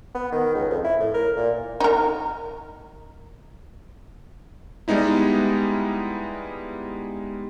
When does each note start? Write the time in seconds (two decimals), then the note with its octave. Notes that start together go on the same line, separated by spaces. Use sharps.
0.15 B3
0.32 D#3
0.55 C#2
0.70 F2
0.84 E4
1.00 A2
1.14 A#4
1.37 A#2
1.80 D#4 A#4
4.88 G3 G#3 B3 D#4 E4